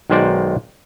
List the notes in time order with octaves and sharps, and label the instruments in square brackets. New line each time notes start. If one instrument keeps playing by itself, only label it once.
[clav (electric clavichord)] B1 D#3 G#3 C5 D5